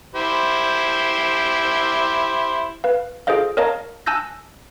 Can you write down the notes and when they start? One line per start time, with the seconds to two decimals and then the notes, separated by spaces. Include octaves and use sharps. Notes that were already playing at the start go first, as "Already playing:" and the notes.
0.15 E4 G4 C5
2.84 B4 F5
3.27 F4 G#4 A4 C5 D#5 F5
3.57 A#4 C#5 D#5 F5 A5 A#5
4.06 G#5 A5 E6 F#6 G6 A#6